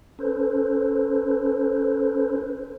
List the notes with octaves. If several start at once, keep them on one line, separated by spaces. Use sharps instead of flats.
C#4 A4 B4 C5